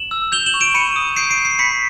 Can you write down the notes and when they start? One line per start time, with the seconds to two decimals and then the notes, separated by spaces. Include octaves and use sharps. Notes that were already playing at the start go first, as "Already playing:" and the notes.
Already playing: E7 F#7
0.11 E6
0.32 G6 F7 G7
0.46 E7 F#7
0.54 C#6
0.60 D7 E7
0.74 B5 C#7 D#7
0.96 D#6
1.16 G6 C7 D7
1.31 C7 D7
1.37 B5
1.45 C7 D7
1.59 B5 B6 C#7